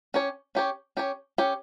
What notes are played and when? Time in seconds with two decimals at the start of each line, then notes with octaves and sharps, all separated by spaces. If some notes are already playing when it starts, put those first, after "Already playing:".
0.14 C#4 G4 C#5
0.55 C#4 G4 C#5
0.97 C#4 G4 C#5
1.38 C#4 G4 C#5